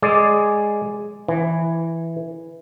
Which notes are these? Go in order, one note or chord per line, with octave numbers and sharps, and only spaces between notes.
G#3 G#4 D5
E3